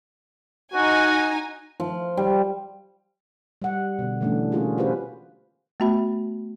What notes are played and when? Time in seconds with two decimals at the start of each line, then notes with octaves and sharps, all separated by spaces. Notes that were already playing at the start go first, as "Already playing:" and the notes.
0.74 D#4 F#4 G#5
1.80 F3
2.17 G3
3.62 G3 F#5
3.99 B2 D3
4.21 D3 E3 A3 C#4 D4
4.52 A#3 C#4 D4 F4 F#4 G#4
4.77 C#4 F4 G4 G#4 B4 C5
5.80 A3 B3 F#4 E5 B5